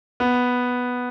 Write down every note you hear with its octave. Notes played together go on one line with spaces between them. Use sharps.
B3